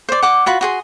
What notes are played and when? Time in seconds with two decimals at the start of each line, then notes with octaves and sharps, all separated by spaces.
0.09 C5 D5
0.23 F#5 D6
0.46 F4 F#4 B5
0.61 F#4 G#4 C6